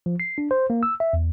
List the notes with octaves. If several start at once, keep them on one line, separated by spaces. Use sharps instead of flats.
F3
C7
D4
C5
A#3
E6
E5
E2